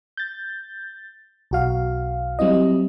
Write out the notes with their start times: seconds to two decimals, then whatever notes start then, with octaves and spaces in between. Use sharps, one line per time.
0.17 G6 A6
1.51 B1 F#4 F5
2.39 F#3 G3 C4 E4 D#5